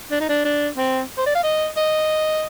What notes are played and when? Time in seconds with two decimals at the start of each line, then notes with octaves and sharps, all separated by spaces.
0.12 D4
0.21 D#4
0.29 D4
0.45 D4
0.78 C4
1.18 C5
1.26 D5
1.35 F5
1.44 D#5
1.77 D#5